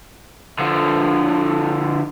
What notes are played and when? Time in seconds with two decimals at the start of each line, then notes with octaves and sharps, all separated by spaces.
0.59 D3 F3